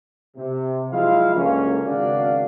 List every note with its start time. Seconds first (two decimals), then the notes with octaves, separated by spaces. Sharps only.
0.37 C3
0.91 F3 F#3 G#3 E4 F4 F5
1.34 C#2 F#2 D3 A#3 C#4
1.85 G#1 C#3 D4 F#4 D5 F5